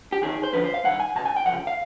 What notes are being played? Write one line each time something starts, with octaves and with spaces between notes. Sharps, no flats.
G4
D#2 D#3 G#4
C5
F2 D3 F3 B4
C5
F5
G2 D#3 F#5
G#5
C#2 B2 A5
G#5
G5
C#2 C3 F3 F#5
F5